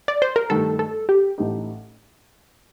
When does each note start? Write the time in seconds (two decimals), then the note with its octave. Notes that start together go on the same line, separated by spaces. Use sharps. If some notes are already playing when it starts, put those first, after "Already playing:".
0.08 D5
0.22 C5
0.36 A#4
0.50 G2 D#3 A3 A4
0.79 A4
1.09 G4
1.38 A1 A2 A3 D#4 G4